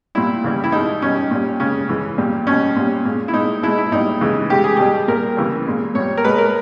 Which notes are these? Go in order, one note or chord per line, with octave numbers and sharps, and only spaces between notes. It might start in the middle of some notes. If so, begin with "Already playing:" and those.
A#2 G3 E4
C#3 E3 G3
E4
B2 G#3 D#4
B2 G3 C#4
A#2 G3
C#3 G#3 C#4
C#3 E3 G#3
A#2 G3
B2 G3 C#4
A#2 G3
A#2 G#3
E4
A#2 G#3 D#4
B2 G#3 E4
E4
A#2 G3 D#4
C#3 E3 G#3
C#3 G#3 G4
G#4
B2 G3 G4
A#2 G3 A#4
C#3 E3 G3
A#2 G#3
A#2 G3 C#5
A#4
B2 G#3 B4
A#4